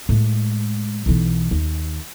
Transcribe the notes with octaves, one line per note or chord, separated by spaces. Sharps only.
A2 G#3
B1 E3
D#2